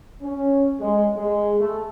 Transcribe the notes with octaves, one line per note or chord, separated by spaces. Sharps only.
C#4
G#3
G#3
A3